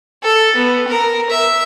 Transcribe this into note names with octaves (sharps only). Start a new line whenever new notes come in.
A4
B3
A#4
E5